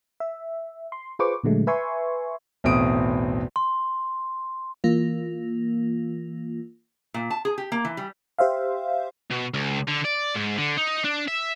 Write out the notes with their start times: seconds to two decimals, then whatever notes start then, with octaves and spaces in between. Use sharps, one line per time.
0.20 E5
0.92 C6
1.19 F4 G#4 B4 C5 C#6 D6
1.43 A#2 D3 F#3 G#3 A3
1.67 B4 E5 G#5 C6 C#6
2.64 B1 E2 A2 C4 D#6 D7
3.56 C6
4.84 E3 A#3 F4
7.14 A#2
7.30 A5
7.45 G#4
7.58 G4
7.72 A#3
7.85 E3
7.97 G3
8.39 G4 C5 E5 F5
9.31 B2
9.54 C#2
9.88 D3
10.04 D5
10.34 G#2
10.57 D3
10.77 D#4
11.04 D4
11.28 E5